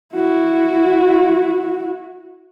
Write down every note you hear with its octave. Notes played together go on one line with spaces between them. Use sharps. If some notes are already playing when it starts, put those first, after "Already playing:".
E4 F#4